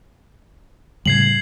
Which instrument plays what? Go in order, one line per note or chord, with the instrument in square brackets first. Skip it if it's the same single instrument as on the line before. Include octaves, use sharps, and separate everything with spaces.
[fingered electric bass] A2 C#3 G3 [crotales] G#6 C7 F#7